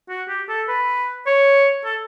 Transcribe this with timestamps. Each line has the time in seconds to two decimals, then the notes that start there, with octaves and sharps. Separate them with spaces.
0.09 F#4
0.28 G4
0.49 A4
0.69 B4
1.27 C#5
1.85 A4